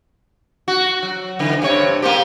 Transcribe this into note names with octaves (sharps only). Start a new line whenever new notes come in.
F#4
F#3
D3 E3
G2 C3 C#5
A#3 C4 G4